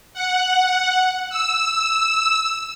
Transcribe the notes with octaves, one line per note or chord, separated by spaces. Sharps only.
F#5
E6